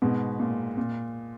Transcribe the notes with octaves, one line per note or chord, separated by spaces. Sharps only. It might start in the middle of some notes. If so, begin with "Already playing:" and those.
G#2 B2
A#2
A#2